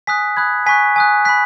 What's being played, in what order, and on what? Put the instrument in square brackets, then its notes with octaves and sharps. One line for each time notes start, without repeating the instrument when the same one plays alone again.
[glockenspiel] G#5 D#6 F#6 B6
B5 D#6 F#6 G#6
G#5 C#6 F#6 B6
G#5 D#6 F#6
B5 F#6 B6